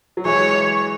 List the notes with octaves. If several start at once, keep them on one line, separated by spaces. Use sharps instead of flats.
F#3
E3 G#3 C#5